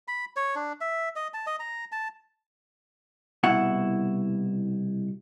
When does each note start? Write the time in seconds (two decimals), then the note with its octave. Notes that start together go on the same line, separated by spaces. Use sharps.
0.08 B5
0.36 C#5
0.55 D4
0.81 E5
1.16 D#5
1.34 A5
1.47 D#5
1.59 A#5
1.92 A5
3.43 C2 B2 E4 F#5